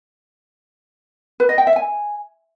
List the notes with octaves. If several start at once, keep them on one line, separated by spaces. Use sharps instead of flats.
B4
D#5
G5
E5
G#5